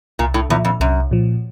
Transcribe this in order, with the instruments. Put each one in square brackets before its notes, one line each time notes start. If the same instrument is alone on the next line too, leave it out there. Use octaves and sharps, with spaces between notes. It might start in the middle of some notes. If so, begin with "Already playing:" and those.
[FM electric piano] C2 [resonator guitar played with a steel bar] A#2
[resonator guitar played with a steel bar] A2
[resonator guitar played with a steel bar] E2 [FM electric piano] A#2 F3
[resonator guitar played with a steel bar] F2
[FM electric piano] C2 [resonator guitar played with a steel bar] F#2
[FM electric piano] A#2 F3